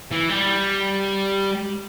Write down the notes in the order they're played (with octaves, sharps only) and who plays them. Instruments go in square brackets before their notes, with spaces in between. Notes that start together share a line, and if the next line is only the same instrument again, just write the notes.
[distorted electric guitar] E3
G3